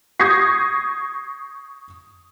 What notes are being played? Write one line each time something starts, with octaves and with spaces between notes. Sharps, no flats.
C#6 D#6 G6 G#6 A#6 C7